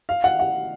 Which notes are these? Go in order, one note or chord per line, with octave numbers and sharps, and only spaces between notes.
F5
F#5
F#5